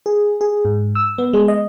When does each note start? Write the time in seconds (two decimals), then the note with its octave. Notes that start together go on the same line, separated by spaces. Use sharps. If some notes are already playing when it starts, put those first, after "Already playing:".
0.06 G#4
0.41 G#4
0.65 G#2
0.95 E6
1.18 B3
1.33 G#3
1.48 D#5